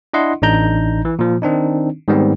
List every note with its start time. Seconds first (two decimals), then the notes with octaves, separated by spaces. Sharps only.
0.14 D4 E4 D#5 F#5 C6
0.42 A1 D4 D#4 A#5 G6
1.05 E3
1.19 A#2 F3
1.42 D#3 C4 D4 D#4
2.08 G#2 D#3 G3 B3 C4